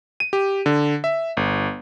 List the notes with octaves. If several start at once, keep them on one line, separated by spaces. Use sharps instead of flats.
D#7
G4
D3
E5
G1